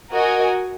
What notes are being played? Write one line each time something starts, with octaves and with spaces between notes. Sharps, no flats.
F#4 A#4 D#5 G#5